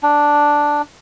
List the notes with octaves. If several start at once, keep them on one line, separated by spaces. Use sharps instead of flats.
D4